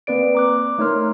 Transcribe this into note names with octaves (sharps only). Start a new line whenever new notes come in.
A#3 C4 B4 D5 D7
A#5 D6 F#6
A3 D#4 A#4 C#5 C6 F6